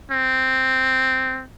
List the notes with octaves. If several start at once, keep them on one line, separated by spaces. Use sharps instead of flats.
C4